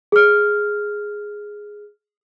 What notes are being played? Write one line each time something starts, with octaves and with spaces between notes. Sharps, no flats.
G#4 F6